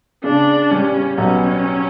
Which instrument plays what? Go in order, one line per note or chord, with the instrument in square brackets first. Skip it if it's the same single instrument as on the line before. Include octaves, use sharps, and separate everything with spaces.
[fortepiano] C#3 [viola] D4
[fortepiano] G3 [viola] C#4
[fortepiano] B1 [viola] C#4